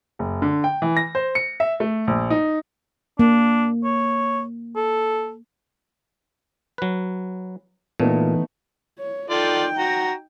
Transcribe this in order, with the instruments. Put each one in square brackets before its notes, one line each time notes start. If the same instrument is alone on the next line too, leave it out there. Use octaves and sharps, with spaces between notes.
[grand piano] F#1
D3
G5
E3
A#6
C5
C#7
E5
A3
A#1
D#4
[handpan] A#3 [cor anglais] D4
[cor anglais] C#5
A4
[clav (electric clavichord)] F#3 B4
[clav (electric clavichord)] A#2 [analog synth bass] E3 [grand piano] A3 B3 D#4
[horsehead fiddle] C#5
[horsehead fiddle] D#4 G5 [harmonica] F4 A4 D5
[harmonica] F#4 A#5